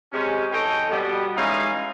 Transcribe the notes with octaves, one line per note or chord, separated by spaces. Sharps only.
C3 G#3 C#4
E3 A4 C#5 D#5 G5
B2 G3 B3
E3 G#3 A3 C#4 D#4 F5